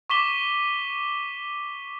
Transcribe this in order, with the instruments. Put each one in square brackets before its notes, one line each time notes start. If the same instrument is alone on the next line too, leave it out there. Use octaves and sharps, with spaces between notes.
[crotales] C#6 D6 B6 E7 G7